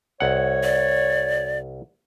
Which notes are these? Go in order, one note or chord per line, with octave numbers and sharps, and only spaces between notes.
C2 C#5 F#5
D5